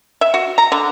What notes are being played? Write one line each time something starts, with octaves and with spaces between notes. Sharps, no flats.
E5
F#4
A#5
D3